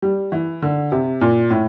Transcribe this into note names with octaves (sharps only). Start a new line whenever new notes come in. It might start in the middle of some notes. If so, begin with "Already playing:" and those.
G3
E3
D3
C3
A#2
A2